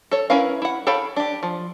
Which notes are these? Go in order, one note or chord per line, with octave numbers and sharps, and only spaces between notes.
A4 C#5
C#4 E4 A#4 B4 F5
E4 F#5
A4 C#5 F5 G5 B5
D4 G4
F3